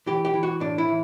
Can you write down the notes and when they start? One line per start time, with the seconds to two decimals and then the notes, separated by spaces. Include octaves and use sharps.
0.06 E3 G4
0.25 G4
0.34 E3
0.43 F#4
0.60 A2 D4
0.78 E4
0.88 E3